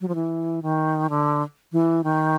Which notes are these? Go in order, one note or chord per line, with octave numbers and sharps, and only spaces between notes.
F#3
F3
E3
D#3
D3
E3
D#3